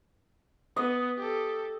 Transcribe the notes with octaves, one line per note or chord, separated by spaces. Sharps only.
B3 D#5
G4 A4